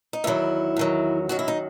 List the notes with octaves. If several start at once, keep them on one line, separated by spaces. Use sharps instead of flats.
D#4
E2 D#3 F#3 E4
E2 D#3 F#3
F#2 D#3 F#3 F#4
E4
D#4